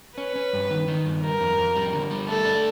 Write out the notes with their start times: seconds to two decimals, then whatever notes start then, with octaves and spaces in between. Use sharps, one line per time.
0.18 C#4 B4
0.36 C#4
0.53 G2
0.70 D#3
0.88 D#3
1.06 G2
1.23 G3 A#4
1.41 F2
1.58 F2
1.76 G3
1.93 D3
2.11 G3
2.28 A3 A4
2.45 D4